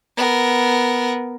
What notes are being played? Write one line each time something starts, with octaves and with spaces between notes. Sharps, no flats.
B3 A#4